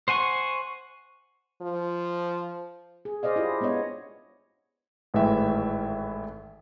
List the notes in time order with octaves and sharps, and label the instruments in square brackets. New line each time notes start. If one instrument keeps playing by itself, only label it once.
[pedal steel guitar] C5 F#5 G#5 C#6
[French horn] F3
[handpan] G#4
G#4 C5 D5 D#5 F5
E4 F4 G4
G#3 B3 D4 C#5 D#5
[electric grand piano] G#1 A2 E3 G#3 E5 G5